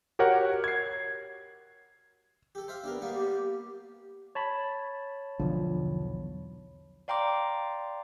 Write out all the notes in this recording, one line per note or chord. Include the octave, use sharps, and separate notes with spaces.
F#4 G4 A#4 C#5 F#5
G#6 C7
G4 A4
C5 E5 F5
B3 D4 G4 A#4
G3 A#3 B3 F5
G4
C#5 A5 B5
B1 E2 D3 F3
D5 F5 G5 A#5 C6 D6